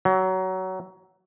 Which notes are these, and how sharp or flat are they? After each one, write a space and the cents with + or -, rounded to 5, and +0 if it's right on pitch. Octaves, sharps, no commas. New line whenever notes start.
F#3 +20